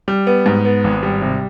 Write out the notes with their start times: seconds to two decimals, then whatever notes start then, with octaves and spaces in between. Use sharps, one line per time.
0.08 G3
0.27 B3
0.46 G#2
0.65 B3
0.84 G#1
1.03 G3
1.22 C3